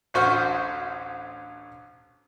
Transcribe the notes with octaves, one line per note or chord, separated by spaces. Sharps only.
A1 D2 F#4 C5 C#6 F6